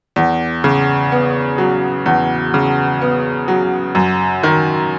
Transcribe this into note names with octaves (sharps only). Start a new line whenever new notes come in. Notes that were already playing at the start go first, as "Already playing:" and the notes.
E2
C#3
B3
F#3
E2
C#3
B3
F#3
F#2
D#3